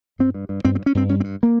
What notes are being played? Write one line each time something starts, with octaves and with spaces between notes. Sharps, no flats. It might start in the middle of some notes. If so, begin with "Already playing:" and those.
G2 C4
G2
G2
G2 C4
C4
G2
C#4
G2 C4
G2 C#4
C4
G2
A#3